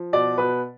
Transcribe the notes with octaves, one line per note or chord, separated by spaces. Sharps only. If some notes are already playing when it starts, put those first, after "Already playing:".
Already playing: F3
B2 D5
B2 B4